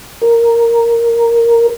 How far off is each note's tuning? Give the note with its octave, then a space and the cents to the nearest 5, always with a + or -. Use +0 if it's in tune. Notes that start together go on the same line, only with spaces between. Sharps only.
A#4 -5